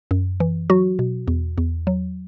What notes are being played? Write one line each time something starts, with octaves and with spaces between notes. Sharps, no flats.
F#2
E3
F#3 F#4
B2
E2
E2
F#3